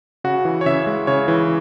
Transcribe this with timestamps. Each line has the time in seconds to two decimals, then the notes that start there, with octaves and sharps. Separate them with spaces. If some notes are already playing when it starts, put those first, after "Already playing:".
0.24 C#3 F#4
0.45 E3
0.61 C#5
0.66 C#3 E5
0.87 G#3
1.07 C#3 C#5
1.28 E3